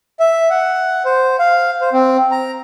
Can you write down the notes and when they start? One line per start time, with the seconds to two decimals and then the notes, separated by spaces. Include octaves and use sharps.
0.20 E5
0.50 F#5
1.05 C5
1.39 F5
1.81 C5
1.93 C4
2.31 A#5